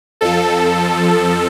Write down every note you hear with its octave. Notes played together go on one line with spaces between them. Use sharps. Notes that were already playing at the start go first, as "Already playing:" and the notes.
F2 F3 A4